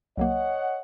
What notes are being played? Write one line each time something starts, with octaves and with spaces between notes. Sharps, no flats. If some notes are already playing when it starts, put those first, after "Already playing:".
C2 F#3 A#3 C#5 D#5 F#5